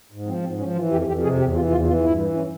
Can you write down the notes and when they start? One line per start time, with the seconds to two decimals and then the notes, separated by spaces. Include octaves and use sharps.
0.12 G#2
0.27 F3 C4
0.43 G#2 C4
0.59 F3 C#4
0.75 E3 F4
0.91 F2 G4
1.07 F2 G4
1.23 C3 G#4
1.39 E2 G4
1.55 E3 F4
1.71 E2 F4
1.87 E3 F4
2.03 G2 E4
2.19 E3
2.35 C#4